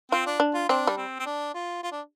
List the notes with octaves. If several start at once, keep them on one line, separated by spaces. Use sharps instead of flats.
C4 F4
D4
D4
F4
C4 D4
G3
C4
C4
D4
F4
F4
D4